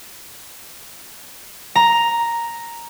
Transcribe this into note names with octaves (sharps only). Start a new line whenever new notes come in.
A#5